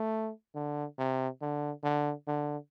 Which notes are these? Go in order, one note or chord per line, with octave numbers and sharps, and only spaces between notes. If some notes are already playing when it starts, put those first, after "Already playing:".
Already playing: A3
D3
C3
D3
D3
D3